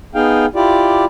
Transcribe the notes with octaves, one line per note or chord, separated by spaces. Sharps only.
B3 D#4 G#4 F5 G5
E4 F4 G4 D5